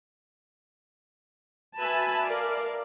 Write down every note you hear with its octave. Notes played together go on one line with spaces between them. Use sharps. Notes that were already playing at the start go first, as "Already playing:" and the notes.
F#4 B4 E5 G#5 A5 B5
A#4 D5 F5